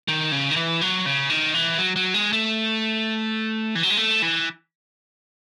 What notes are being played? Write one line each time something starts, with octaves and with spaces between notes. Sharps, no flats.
D#3
C#3
D#3
E3
F#3
C#3
D#3
E3
F#3
F#3
G#3
A3
E3
F#3
G#3
A3
E3